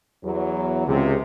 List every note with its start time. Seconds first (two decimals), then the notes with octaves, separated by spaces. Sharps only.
0.24 E2 F#3
0.87 C#2 C3 G#4